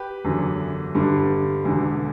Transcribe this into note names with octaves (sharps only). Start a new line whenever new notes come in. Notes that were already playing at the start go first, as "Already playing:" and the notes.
Already playing: G4 B4
F#1 E2 D3 F#3
G1 G2 D3 G3
E1 E2 D3